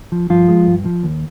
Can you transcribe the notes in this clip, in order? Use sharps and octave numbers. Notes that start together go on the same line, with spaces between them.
F3
G2 F3 F4
G#3
G2
F3
D#2